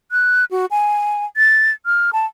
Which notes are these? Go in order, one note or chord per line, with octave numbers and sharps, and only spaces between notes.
F#6
F#4
G#5
A6
F6
A5